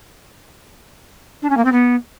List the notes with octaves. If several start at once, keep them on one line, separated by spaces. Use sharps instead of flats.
D4
C#4
A#3
C4
B3